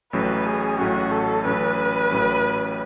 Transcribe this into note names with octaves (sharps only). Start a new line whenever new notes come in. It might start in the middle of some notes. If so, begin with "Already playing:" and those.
A1 A2 F#3 C#4 B4
G#4
A1 A2 F#3 C#4 F#4
A4
A1 A2 F#3 C#4 B4
A1 A2 F#3 C#4